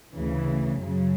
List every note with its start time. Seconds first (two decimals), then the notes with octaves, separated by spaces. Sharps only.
0.14 D2 C#3 E3
0.78 F#2 C#3 F#3